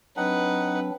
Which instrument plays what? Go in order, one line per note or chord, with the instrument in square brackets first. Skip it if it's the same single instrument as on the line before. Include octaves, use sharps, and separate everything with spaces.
[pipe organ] F#3 C4 D4 [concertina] D#4 F#5 [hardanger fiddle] B4